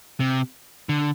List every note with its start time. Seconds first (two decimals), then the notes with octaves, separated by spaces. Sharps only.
0.20 C3
0.89 D3